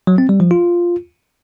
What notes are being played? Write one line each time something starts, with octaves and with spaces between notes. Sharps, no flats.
F#3
C4
G3
F3
F4